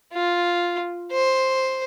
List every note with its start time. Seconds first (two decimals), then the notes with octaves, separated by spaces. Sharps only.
0.13 F4
1.12 C5